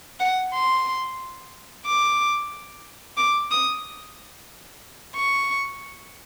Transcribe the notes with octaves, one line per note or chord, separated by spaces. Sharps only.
F#5
C6
D6
D6
D#6
C#6